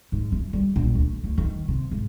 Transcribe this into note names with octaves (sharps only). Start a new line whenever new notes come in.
G#2
E3
G3
A#1
D2
D2
D#3
C3
G#2